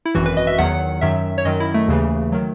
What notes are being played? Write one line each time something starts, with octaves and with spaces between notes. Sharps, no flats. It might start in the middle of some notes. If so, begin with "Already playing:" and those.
E4
G#1 F#2 E3 F#4
B4
D#5
E5
E2 D#3 F#3 F#5
F#2 D#3 F#3 E5
C#5
F#2 D#3 F#3 D#5
E4
A3
D#2 C#3 E3
D#3 F#3